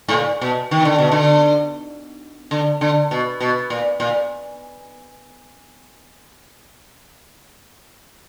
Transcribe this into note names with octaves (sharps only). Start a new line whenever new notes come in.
G#2
A#2
B2
D#3
D3
B2
D3
D3
D3
B2
B2
A#2
A#2